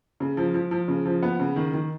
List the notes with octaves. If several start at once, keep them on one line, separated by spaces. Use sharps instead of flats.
C#3
F3
F3
F3
C#3
F3
B3
C#3
D#3
D#3